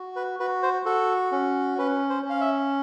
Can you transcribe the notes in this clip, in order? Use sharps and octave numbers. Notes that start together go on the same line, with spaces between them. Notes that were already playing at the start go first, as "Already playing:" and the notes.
Already playing: F#4
B4
F#4 B4
C5
F#4 A4
C#4
C#4 B4
C5
C#4 F5
E5